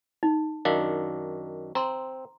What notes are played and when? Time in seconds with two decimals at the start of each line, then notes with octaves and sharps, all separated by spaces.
0.23 D#4
0.65 F#2 D#3 D4 F5
1.75 C4 A#5 C6